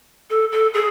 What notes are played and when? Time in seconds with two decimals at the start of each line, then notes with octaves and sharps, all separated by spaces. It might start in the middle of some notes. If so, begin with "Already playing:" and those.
0.30 A4
0.52 A4
0.74 G#4